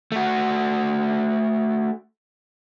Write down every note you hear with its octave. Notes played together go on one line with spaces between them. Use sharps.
A3 F#4